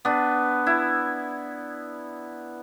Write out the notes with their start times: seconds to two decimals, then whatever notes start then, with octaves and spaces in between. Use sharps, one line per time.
0.05 B3 D4
0.66 E4